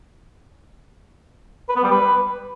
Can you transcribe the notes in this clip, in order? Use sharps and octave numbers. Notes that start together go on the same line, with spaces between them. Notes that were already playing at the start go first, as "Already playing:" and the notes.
B4
B3
G3
B4